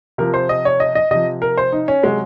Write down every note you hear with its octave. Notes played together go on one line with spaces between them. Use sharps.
C3 F3 A#4
C5
D#5
C#5
D#5
D#5
C3 F3 D#5
A#4
C5
D#4
C#4
C3 F#3 G#3